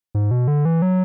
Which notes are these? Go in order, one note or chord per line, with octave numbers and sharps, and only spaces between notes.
G#2
B2
D3
E3
F#3